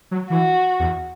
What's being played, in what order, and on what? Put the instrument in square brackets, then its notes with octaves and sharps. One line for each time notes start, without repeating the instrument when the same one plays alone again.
[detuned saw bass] F#3
[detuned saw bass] E3 [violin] F#4
[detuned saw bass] E2